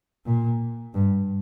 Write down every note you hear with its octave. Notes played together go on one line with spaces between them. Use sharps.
A#2
G2